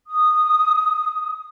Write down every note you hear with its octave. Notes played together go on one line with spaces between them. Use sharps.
D#6